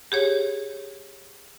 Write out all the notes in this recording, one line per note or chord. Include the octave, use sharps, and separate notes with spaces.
G4 G#4 C#5